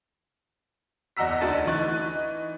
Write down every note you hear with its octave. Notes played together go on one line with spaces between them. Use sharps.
E2 D#5 F#5 A#5 E6 B6
D2 D3 D#4 F#4 A5 A6
E3 D#4 C#6 F#6 A6